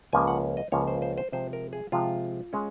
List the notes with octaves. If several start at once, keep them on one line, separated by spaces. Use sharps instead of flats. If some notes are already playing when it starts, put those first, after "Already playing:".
C#2 C#3 F3 A#3 C#4 G#5
F#5
D#5
C#2 C#3 F3 A#3 C#4 C#5
C5
C5
C5
C3 F3 G#3 C5
A#4
G#4
C3 F3 G#3 F4
G#3 C#4